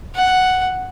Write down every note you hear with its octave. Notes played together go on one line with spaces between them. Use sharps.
F#5